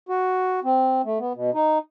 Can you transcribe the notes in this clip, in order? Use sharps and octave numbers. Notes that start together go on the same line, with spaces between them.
F#4
C4
A3
B3
B2
D#4